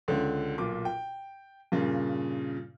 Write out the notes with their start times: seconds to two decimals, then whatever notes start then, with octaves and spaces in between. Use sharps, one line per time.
0.08 C#2 D3 C#4
0.58 B1 A#2 D6
0.85 G5
1.72 G2 A#2 C#3